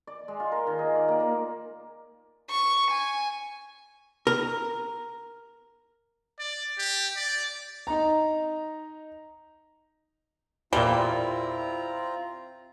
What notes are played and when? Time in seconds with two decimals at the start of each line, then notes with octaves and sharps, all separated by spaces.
0.07 D5
0.28 G#3
0.40 F4
0.52 A#4
0.67 D#3
0.79 G#4
0.95 D5
1.08 A#3
1.20 A#3
2.50 C#6
2.90 G#5
4.27 A#4
6.39 D5
6.78 G4
7.16 D5
7.87 D#4 A#5
10.73 E2 A#2 G3 C4 E4 F4 A#5